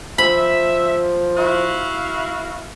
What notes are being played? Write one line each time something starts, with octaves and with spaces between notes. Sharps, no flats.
F3 E5 B5
E4 F#4 F5